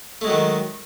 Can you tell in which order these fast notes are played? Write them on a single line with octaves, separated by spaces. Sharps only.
A3 G#3 F#3 D#3